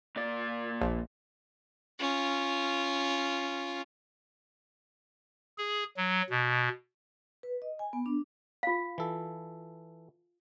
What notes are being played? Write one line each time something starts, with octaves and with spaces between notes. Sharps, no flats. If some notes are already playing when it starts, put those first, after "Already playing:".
A#2 D5
A#1
C#4 F4
G#4
F#3
B2
B4
D#5
G#5
B3
D4
F4 F5
E3 A4